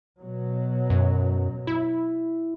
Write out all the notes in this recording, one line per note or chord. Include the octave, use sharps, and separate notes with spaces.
B2 F#3
F#2
E4